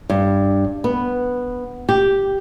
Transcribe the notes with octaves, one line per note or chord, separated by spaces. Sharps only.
G2
B3
G4